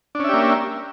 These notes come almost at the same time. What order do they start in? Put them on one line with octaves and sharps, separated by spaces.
D4 C#4 E5 G4 A#3